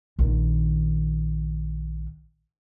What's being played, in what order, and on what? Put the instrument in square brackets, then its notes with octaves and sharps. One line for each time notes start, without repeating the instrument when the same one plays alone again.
[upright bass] A#1 D#3